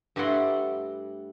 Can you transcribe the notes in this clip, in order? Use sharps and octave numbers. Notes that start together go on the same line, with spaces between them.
G2 G3 A3 E4 F#5 C6